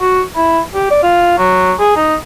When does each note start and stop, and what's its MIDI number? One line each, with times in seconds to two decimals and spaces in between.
0.01 0.22 66
0.36 0.60 64
0.74 0.91 67
0.91 1.00 74
1.02 1.34 65
1.38 1.73 54
1.80 1.94 68
1.96 2.15 63